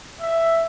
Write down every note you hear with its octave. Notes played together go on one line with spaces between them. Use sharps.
E5